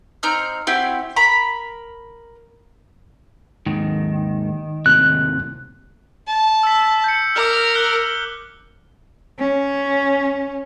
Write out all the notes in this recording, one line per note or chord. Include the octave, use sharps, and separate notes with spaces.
C4 D#4 A#5 F6
C4 E4 F#4 G4
A#4 A#5 B5
D#2 G#2 D#3
D#2 A2 C3 F#6
A5
E6 B6
G6 C#7
A#4 D6 F6
E6 F#6 G7
C#4